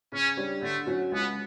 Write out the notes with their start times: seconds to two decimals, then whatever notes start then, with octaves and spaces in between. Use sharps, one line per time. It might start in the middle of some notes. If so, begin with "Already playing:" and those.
0.12 C#3 C#4
0.37 G3 D4 G4 C#5
0.62 D3 A3
0.87 F#3 C#4 F#4
1.12 C#2 B3